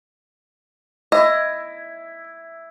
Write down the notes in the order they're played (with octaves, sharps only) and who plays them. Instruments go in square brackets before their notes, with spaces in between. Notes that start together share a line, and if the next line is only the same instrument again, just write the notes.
[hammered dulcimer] E4 [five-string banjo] D#5